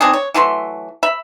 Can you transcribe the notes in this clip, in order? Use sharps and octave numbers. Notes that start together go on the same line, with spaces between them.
C4 D4 D#4 G#4
C#5
E3 F#3 A3 C6
E5 B5